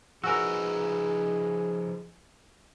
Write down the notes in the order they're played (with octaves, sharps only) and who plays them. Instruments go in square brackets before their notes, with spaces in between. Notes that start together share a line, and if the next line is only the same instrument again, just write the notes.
[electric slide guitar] F3 D#4 B4 [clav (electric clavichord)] F#4 A#4 [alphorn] G#4 [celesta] G#5 E6